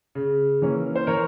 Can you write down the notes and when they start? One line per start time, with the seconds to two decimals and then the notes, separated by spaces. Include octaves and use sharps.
0.15 C#3
0.62 E3 A#3 C#4
0.96 C5
1.07 E3 A#4 C#5